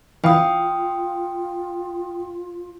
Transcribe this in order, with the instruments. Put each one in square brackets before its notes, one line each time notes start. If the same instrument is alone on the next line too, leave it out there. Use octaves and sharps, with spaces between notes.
[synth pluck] E3 [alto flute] F4 [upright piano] F5 [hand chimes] G5 D#6